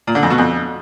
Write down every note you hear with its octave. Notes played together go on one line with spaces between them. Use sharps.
A#2
D3
F2
B2
F2